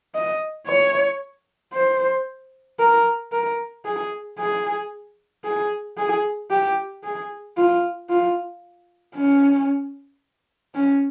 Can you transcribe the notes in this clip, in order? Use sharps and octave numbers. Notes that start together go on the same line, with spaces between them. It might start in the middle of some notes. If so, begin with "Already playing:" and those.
D#5
C#5
C5
A#4
A#4
G#4
G#4
G#4
G#4
G4
G#4
F4
F4
C#4
C#4